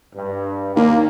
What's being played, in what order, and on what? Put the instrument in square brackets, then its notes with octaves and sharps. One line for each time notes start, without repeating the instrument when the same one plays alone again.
[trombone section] G2
[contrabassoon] D#2 [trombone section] A#3